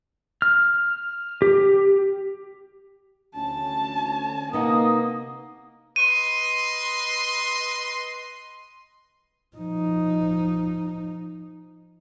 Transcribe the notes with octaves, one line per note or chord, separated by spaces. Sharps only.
F6
G4
D2 C#4 G#5 A5
C3 A#3 B3 D#4 A#4 D#5 F#5 D#6
B4 D#5 C6 D#7
F3 D#4